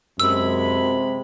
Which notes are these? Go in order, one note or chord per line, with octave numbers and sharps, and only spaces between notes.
F#2 C3 G#3 B5 E6